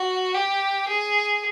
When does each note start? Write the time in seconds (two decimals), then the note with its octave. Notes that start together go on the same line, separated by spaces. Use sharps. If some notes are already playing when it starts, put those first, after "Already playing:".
Already playing: F#4
0.35 G4
0.88 G#4